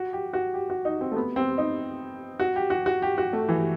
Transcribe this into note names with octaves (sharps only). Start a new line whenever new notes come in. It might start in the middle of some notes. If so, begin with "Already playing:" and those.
Already playing: F#4
G4
F#4
G4
F#4
D#4
C4
A3
B3
C4
D#4
F#4
G4
F#4
F#4
G4
F#4
A3
E3